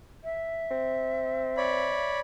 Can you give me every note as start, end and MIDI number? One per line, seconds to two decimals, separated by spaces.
0.24 2.12 76
0.71 2.04 60
1.57 2.20 73
1.57 2.20 74
1.57 2.20 83